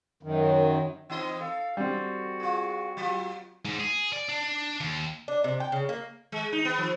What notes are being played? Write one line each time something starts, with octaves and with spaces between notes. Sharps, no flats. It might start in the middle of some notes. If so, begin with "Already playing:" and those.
F#2 D#3
E3 C4 D#4 D#5
A4 F5
G3 C4 F#4
F4 G#4
F#3 F4
G#2
G#4
D5
D4
D#2
D4
C3
G5
C#3
A#3
G#3
D#4
B3
F3